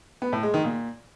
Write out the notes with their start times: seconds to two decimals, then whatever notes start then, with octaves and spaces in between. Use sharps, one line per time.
0.22 B3
0.32 A2
0.43 G#3
0.54 D#3
0.64 A#2